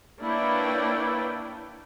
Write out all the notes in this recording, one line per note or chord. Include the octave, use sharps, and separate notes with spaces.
A#3 D4 E4 B4 C#5 G5